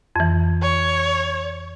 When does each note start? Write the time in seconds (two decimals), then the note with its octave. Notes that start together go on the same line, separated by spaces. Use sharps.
0.16 F2 E3
0.62 C#5